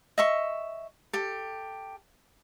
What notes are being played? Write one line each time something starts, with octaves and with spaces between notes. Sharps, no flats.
D#5 E5 C#6
G4 A4